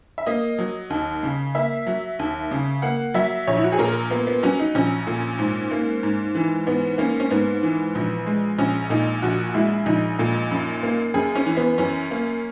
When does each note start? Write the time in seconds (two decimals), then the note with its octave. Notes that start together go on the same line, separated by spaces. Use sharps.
0.18 E5
0.27 A#3 D#5
0.59 F#3
0.90 D#2
1.23 C#3
1.55 A#3 E5
1.87 F#3
2.19 D#2
2.51 C#3
2.82 A#3 F#5
3.14 F#3 E5
3.47 A#1 C#5
3.57 E4
3.64 F#4
3.72 G#4
3.78 A#2 A#4
4.10 A#3 B3
4.27 B3
4.43 F#3 C#4
4.59 D#4
4.75 A#1 C#4
5.07 A#2
5.39 G#2
5.71 A#3
6.03 G#2
6.35 E3
6.66 G#2 B3
6.98 A#3 C#4
7.20 C#4
7.31 G#2 B3
7.63 E3
7.95 A#1
8.27 G#3
8.58 A#1 C#4
8.90 A#2 D#4
9.22 A#1 F#4
9.54 G#3 E4
9.86 A#1 D#4
10.19 A#2
10.51 F#2
10.83 A#3
11.14 F#2 G#4
11.35 C#4
11.46 E3
11.57 B3
11.78 F#2 C#4
12.11 A#3